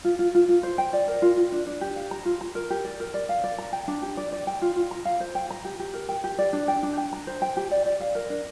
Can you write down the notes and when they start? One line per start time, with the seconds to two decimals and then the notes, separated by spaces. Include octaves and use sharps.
0.04 F4
0.19 F4
0.35 F4
0.49 F4
0.63 C5
0.78 G5
0.93 D5
1.08 A#4
1.22 F4
1.37 F4
1.52 D4
1.67 D4
1.81 G4
1.96 F5
2.11 A#5
2.25 F4
2.41 A#5
2.55 A#4
2.70 G4
2.85 D5
3.00 A#4
3.14 D5
3.29 F5
3.44 D5
3.58 A#5
3.73 G5
3.88 D4
4.02 G4
4.17 D5
4.32 D5
4.47 G5
4.62 F4
4.76 F4
4.91 A#5
5.05 F5
5.20 C5
5.35 G5
5.50 A#5
5.65 G4
5.80 G4
5.94 A#4
6.09 G5
6.24 G4
6.39 D5
6.53 D4
6.68 G5
6.83 D4
6.97 G5
7.13 A#5
7.27 C5
7.42 G5
7.57 G4
7.71 D5
7.86 D5
8.00 F5
8.15 A#4
8.30 D4